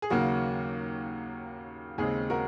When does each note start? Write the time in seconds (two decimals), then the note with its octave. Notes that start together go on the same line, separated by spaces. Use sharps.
0.02 G#4
0.10 D#2 C#3 F#3 A#3 F#4
1.98 D#2 C#3 G#3 C4 G#4
2.30 F#4 A#4